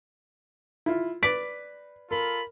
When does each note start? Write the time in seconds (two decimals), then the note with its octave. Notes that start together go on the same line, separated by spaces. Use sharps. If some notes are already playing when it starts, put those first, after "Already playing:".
0.86 E4 F4
1.23 B4 D5 B6
2.11 F4 A4 A#4 B5